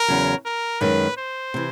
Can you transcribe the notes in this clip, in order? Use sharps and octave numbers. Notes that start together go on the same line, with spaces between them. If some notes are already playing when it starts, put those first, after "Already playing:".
Already playing: A#4
E2 C#3 F#3
A#4
F#2 D#3 G#3 B4
C5
C3 E3